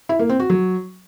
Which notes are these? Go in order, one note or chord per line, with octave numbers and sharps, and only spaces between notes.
E4
A#3
C4
F#4
F#3